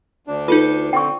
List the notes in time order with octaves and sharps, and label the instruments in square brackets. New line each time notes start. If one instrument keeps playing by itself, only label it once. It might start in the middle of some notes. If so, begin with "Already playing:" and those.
[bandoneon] D2 D4
[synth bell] D#4 A4 B4 [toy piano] F4
[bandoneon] D3 C4 [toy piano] G5 C#6